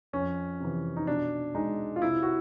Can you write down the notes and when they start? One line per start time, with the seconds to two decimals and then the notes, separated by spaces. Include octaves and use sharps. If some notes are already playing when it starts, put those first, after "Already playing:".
0.13 F2 C#4
0.60 C3 E3
0.97 D#4
1.07 B2 D4
1.55 G#3 D#4
1.96 F4
2.02 C3 E4
2.23 F#4